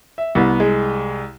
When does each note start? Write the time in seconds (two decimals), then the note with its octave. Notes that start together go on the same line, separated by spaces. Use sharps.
0.18 E5
0.35 C2 B3
0.60 G#3